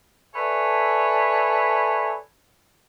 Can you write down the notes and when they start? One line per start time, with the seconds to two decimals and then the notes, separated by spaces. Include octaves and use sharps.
0.34 A4 B4 C#5 D5 E5 G#5